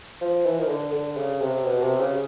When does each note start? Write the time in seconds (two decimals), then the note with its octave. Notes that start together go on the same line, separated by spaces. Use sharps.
0.21 F3
0.46 E3
0.60 D#3
0.69 D3
0.92 D3
1.17 C#3
1.41 C3
1.65 B2
1.82 C3
2.00 C#3